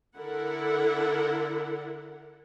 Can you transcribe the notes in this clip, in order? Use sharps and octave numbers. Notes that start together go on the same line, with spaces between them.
D3 E4 A4 A#4 F#5